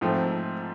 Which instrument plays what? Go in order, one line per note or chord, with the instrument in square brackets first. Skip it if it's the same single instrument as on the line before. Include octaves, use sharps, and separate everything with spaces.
[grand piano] G#2 F3 A3 C4